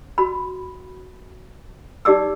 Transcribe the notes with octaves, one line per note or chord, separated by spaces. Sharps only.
F#4 B5
D#4 G4 D5 D6 E6